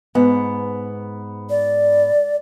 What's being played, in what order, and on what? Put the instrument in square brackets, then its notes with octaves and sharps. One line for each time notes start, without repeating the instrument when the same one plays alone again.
[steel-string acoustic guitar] G#2 B3
[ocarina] D5